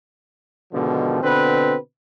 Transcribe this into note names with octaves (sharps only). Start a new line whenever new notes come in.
G#2 B2 D3 D#3 F3
B2 D3 C4 B4